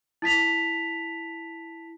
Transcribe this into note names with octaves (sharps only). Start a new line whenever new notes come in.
E4 A5 B6 F7